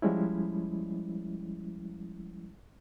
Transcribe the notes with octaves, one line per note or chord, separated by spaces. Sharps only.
F3 G3 G#3 C#4 E4